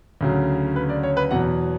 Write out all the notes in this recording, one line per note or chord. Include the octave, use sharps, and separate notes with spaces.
D2 C#3 F#3
B4
D5
C#5
B4
E2 B2 F#3 F#5